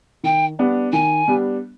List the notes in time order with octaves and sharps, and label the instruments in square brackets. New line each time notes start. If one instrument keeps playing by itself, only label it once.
[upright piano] D#3 [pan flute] G5
[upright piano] G3 B3 D4
[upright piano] D#3 [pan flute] G#5
[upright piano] G3 B3 D4